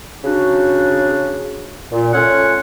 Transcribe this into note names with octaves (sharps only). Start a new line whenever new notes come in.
C#3 D4 D#4 F#4
A#2
A3 C#4 F4 C#5 F#5